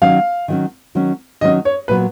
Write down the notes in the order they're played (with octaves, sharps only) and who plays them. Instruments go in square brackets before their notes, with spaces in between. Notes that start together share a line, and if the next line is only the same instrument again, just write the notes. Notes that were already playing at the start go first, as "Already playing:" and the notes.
[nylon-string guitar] D#3 F#3 C#4 [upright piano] F5
[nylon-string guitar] D#3 F#3 C#4
D#3 F#3 C#4
[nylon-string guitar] D#3 F#3 C#4 [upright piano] D#5
[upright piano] C#5
[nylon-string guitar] A#2 F#3 B3 [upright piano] B4